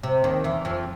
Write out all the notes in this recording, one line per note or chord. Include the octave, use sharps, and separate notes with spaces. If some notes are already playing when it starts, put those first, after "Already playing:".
C3
D#2 D#3
E2 E3
F2 F3